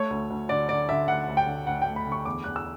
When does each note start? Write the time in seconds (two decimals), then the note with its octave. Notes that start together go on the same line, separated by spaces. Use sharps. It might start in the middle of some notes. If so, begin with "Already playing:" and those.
Already playing: A3 C#5
0.10 D2
0.30 D2
0.49 D3 D5
0.69 D3 D5
0.89 D3 E5
1.08 D2 F#5
1.28 D2
1.37 G5
1.47 D3
1.67 D2 F#5
1.82 G5
1.87 A3
1.96 B5
2.07 D3
2.12 C#6
2.25 E2 D6
2.44 E2 F#6
2.56 E6